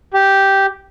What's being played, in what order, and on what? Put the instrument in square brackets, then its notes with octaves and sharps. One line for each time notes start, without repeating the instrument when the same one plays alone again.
[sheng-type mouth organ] G4